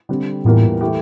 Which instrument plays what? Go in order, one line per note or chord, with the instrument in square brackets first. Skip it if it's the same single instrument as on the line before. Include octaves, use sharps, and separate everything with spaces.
[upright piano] D3 G3 C4
[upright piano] E2 E3 G3 A#3 F4 [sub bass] A2
[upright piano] E3 A3 E4 G4